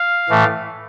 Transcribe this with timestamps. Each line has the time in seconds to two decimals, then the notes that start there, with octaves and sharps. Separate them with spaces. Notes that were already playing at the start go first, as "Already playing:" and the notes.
Already playing: F5
0.29 A2 E3 A3